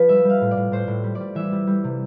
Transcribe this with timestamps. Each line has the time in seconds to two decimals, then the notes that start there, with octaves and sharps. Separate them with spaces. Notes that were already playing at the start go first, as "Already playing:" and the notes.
Already playing: F3 B4
0.09 G3 E5
0.25 G3 F5
0.41 A2
0.51 D5
0.57 A2
0.72 A2 C5
0.88 A2
1.04 G3
1.15 D5
1.20 G3
1.35 E3 E5
1.52 G3
1.67 G3
1.84 C3